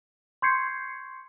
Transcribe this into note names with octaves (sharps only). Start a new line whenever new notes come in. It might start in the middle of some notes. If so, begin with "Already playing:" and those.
C6 C#6 G6 G#6 C7 C#7